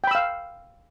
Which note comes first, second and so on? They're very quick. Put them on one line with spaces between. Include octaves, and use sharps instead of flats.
G5 B5 E6 F5